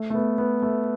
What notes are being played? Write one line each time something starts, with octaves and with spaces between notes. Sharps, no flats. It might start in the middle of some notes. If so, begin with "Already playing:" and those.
Already playing: A3
A3
B3
B3
A3